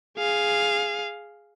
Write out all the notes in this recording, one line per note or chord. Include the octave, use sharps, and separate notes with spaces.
G#4 F5